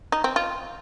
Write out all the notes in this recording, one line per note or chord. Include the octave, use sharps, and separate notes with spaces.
D#4
C4
F4